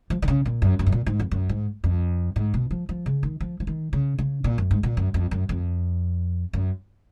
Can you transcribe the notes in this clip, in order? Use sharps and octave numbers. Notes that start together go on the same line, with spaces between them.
F3
D#3
C#3
A#2
F#2
F#2
G#2
A#2
G#2
F2
F#2
G#2
F2
G#2
B2
F3
F3
C#3
D#3
F3
F3
D#3
C#3
C#3
A#2
F#2
G#2
A#2
F#2
F2
F#2
F2
F#2